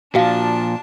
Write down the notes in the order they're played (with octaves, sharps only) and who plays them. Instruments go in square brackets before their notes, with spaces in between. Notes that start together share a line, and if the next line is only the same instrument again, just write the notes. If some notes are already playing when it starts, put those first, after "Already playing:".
[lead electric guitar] A#2 F3 [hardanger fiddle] D4 A5 [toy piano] F#4 F5